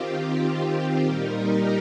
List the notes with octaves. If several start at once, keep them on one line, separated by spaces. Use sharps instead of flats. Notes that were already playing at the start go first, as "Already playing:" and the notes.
Already playing: D#3 C4 F4 G4
A#2 G3 D#4 A#4
G4